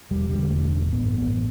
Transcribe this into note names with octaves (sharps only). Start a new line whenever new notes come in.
E1 G3
D3 G3
E1 A3
G2
A1
B3
G2
B3
A1